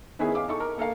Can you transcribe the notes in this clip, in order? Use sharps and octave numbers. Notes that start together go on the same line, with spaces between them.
D#3 B3 C#4 E4 G#4
F5 D6
D#4 A4 C#6
A#4
A#3 A4 A#4 F5